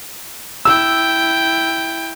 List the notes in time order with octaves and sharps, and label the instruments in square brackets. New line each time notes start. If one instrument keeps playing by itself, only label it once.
[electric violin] E4 G5 [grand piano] E6